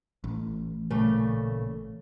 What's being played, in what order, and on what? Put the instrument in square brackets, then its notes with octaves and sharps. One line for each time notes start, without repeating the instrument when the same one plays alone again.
[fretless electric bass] A1
[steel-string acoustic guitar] A#2 C#3 A3